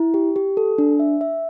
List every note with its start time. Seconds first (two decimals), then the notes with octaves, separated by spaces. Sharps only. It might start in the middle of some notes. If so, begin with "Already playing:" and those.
Already playing: E4
0.14 G4
0.36 G4
0.57 A4
0.78 D4
1.00 E5
1.21 E5